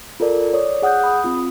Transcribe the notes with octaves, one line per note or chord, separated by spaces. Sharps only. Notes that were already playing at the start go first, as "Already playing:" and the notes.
F4 A4 A#4 D5
C#5 D5 D#6
G#4 F#5 D#6 F#6 G6
B5 D#6
C4 F4